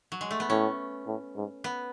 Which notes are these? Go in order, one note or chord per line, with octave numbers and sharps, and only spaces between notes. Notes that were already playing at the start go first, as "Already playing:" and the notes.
F#3
G#3
A3
B3
A2 C#4
A2
G#2
B3